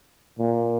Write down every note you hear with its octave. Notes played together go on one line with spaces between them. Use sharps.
A#2